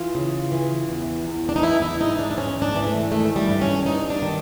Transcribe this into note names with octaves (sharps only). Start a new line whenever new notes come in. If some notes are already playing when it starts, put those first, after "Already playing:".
Already playing: E3 F4
C#3
E3
E2
E2
D4
D#4
E3 E4
E4
G#2 D#4
D4
D4
G#2 C#4
D4
E3
A3
D#3 A3
G3
G2
C#4
G2 D#4
D4
D#3